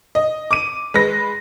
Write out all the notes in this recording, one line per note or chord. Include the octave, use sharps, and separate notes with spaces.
D#5
D6 D#7
G#3 B4 A#6